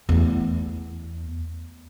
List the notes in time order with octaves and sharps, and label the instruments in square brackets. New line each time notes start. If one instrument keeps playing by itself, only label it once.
[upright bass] E2 A3